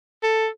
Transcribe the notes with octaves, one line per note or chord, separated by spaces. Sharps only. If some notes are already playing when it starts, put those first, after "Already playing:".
A4